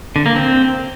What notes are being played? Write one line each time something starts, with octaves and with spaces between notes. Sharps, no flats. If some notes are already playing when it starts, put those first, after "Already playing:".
D3
A#3
C4